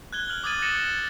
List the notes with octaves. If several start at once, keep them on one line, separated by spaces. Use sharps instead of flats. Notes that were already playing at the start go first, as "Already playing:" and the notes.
F#6 G#6 G7
F6 G#6 F#7
D6 D#6 G#6 A6 D#7 F#7
A#6 C#7 E7
A6